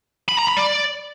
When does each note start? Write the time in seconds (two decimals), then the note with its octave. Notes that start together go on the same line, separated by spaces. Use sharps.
0.28 B5
0.38 A#5
0.47 B5
0.57 D5